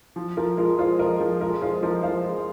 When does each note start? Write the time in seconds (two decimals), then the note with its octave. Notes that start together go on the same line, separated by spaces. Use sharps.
0.16 F3
0.37 F3 F4 A#4
0.57 G#3 F4 A#4
0.79 F4 G#4 C5
0.99 F3 A#4 D#5
1.20 F3 G#4
1.41 G#3 F4 A#4
1.61 F4 G#4 C5
1.83 F3 A#4 D#5
2.03 F3 C5 F5
2.24 G#3